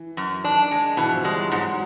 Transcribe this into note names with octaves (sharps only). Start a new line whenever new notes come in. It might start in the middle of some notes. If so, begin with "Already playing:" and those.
Already playing: E3
F#2
D#3 D4
G#3
B2 E3
F3
G3 G#3
F#3
G#2 F#3